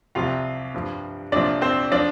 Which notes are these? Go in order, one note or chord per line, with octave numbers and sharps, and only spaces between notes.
C2 C3 F3 F4 F5
G2 F3
C2 A#2 F3 D4 D5
C4 C5
F3 D4 D5